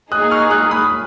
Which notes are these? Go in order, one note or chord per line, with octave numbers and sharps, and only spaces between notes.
A#3 D#4 G#4 D#6 F#6
C#6 F6
D#6 F#6
B5 D#6